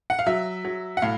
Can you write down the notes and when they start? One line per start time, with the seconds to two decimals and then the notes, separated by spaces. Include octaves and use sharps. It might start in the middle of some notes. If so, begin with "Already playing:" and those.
0.10 F#5
0.19 F5
0.27 F#3 E5
0.65 F#3
0.97 F#5
1.02 A2 F5